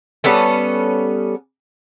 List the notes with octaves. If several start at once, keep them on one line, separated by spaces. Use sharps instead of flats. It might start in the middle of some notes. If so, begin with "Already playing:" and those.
G3 B3 C#4 A4